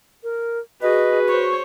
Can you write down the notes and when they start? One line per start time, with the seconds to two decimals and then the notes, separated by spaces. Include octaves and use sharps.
0.24 A#4
0.82 F#4 G#4 B4 D#5
1.28 C5 C#5 C#6